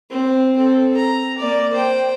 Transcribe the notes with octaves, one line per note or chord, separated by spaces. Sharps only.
C4
C4 A4
A#5
A#3 D5
C5 G5